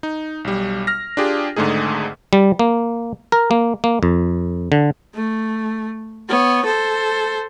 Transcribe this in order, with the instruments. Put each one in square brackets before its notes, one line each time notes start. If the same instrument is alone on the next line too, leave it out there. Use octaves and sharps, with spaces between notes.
[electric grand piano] D#4
B1 G3
F6 A#6
D4 F4 G4 G#4
G#1 G#2 D3 A3 D#4 G#4
[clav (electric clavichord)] G3
A#3
A#4
A#3
A#3
F2
D3
[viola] A3
B3 C#5
A4 C5